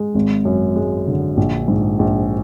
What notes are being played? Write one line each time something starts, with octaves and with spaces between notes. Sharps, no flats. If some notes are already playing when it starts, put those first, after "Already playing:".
Already playing: G#3
G#1
F#2
G#3
D3
A#1
G#2
A#1